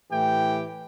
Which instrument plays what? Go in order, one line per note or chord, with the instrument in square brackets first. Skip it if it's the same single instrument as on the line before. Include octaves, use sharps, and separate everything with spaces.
[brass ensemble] A2 E3 G4 G5